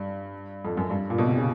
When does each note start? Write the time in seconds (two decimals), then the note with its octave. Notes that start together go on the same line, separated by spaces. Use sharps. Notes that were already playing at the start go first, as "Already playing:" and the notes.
Already playing: G2
0.65 F2
0.77 F#2
0.90 G2
1.10 A#2
1.18 B2
1.27 C3
1.37 C#3